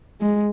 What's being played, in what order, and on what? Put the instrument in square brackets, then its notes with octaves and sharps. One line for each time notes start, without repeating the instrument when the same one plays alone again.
[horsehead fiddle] G#3